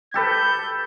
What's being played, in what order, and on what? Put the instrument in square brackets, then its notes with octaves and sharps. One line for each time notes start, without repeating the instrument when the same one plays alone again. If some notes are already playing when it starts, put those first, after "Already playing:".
[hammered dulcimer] G4 A4 B4 [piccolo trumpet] G6